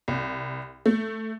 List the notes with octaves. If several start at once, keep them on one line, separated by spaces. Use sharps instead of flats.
C2
A3